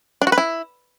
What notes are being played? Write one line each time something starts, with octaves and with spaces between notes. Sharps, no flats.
D4
F#4
B4
E4